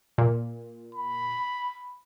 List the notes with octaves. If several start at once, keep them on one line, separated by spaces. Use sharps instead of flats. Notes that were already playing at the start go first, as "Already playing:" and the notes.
A#2
B5